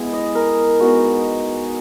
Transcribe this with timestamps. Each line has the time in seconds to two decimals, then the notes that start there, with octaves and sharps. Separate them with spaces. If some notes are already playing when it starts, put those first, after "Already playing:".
Already playing: G#3 B3 E4
0.13 D#5
0.35 A#4
0.80 G#3 B3 D#4 F#4